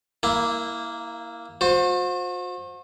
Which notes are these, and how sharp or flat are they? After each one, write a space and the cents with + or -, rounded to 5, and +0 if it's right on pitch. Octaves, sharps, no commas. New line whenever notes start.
A#3 +0 E4 -10 F5 -35
F#4 -45 C5 +0